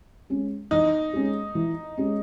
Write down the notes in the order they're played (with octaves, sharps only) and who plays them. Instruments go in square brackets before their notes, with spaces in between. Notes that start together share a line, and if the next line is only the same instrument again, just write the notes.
[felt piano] G#3 C#4
[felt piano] E3 [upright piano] D#4
[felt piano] G#3 C#4
E3
G#3 C#4